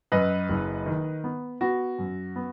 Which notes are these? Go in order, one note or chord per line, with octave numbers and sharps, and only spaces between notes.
F#2 B4 D#5
F#1
D#3
B3
B3 F#4
F#2
B3